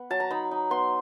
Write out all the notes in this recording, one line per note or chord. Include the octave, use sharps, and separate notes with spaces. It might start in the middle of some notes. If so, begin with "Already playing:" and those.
Already playing: B3
F#3 A5
A#5
D#4 B5
D#4
B3 C6